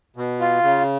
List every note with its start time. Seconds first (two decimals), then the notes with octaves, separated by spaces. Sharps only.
0.16 B2
0.40 F4
0.63 C#3